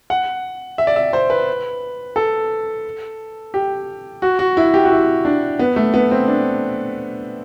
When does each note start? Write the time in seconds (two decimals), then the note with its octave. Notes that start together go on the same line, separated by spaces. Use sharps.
0.10 F#5
0.78 E5
0.87 D5
0.96 E5
1.13 C5
1.30 B4
2.16 A4
3.54 G4
4.22 F#4
4.39 F#4
4.57 E4
4.74 G4
4.84 F#4
4.91 E4
5.25 D4
5.59 B3
5.76 A3
5.94 B3
6.11 C4
6.28 D4